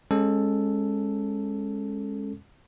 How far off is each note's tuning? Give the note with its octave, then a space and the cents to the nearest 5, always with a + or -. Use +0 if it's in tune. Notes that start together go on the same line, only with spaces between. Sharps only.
G#3 -5 C#4 -20 A4 +0